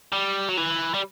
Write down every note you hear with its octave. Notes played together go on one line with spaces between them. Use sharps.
G3
F#3
E3
G3